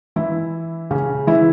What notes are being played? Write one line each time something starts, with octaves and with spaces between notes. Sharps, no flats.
E3 E4
C#3 C#4
E3 E4